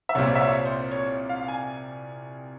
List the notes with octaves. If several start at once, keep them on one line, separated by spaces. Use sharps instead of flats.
E5
C2 A#2 G3 C4 F4 C#5
E5
C#5
C5
C#5
F5
G#5